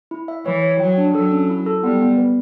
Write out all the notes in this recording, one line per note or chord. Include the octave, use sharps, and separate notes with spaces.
E4
E5
E3 C#5
C#5
F#3 G5
D4
F#3 A4
C#4
E4
A4
G3 B3
B3
B4